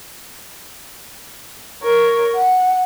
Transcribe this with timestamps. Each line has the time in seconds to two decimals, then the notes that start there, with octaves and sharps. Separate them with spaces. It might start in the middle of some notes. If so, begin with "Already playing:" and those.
1.83 A#4 C#5
2.36 F#5